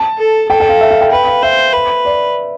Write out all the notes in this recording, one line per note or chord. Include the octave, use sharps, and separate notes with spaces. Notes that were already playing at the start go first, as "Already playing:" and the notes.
Already playing: A5
A4
A4 G5
G5
F5
E5
F5
G5
B4 G5
F5
C5 E5
B4
D5